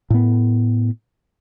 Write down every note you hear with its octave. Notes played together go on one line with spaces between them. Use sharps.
A2 B3